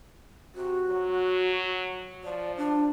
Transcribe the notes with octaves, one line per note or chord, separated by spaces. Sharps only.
C3 F#4
F#3
F3 D5
D4